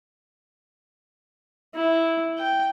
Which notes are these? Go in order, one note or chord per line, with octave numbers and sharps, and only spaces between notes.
E4
G5